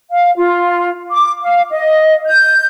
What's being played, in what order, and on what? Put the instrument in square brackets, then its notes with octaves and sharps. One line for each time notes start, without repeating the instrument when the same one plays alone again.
[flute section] F5
F4
D6
F5
D#5
G6